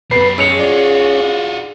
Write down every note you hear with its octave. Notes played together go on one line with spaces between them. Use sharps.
F#2 G3 B3 B4 C7
G#3 C#4 E6 C#7 F7
F4 F#4 D5